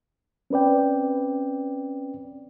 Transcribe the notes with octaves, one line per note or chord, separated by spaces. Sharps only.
C4 C#4 B4 D5 G5